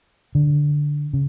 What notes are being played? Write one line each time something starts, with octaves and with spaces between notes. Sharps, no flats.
D3
C#3